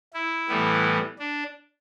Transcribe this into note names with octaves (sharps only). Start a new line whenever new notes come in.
E4
A2 E3 G3 B3
D4